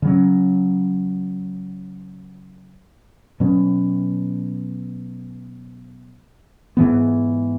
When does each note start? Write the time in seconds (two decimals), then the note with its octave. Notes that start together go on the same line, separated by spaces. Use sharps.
0.02 C#3 F#3 C#4
3.40 B2 F#3 C#4
6.77 G#2 E3 B3